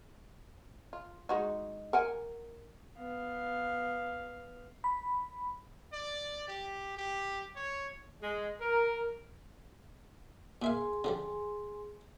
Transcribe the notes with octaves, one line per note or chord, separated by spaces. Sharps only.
F4
G#3 D#4 F#4
A#4 F#5 G#5
B3 F5
B5
D5
G4
G4
C#5
G#3
A#4
A#2 G#4 E5 F5 G#5 C6
D3 F3 G3